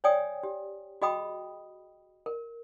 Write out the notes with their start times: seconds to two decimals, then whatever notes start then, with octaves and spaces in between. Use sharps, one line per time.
0.04 C#5 D5 G5 G#5 D#6
0.43 G4
1.02 F#4 G#4 D#5 G5 B5 D#6
2.26 A#4